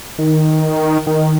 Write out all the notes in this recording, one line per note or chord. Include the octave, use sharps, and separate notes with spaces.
D#3
D#3